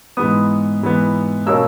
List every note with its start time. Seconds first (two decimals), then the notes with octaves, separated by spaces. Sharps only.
0.17 G#2 E3 B3 D#6
0.82 G#2 E3 B3
1.46 B2 A#3 C#4 E6